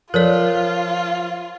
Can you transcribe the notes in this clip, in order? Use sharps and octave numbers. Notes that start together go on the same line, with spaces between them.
F3 F4 A4 A#4 C#5 D5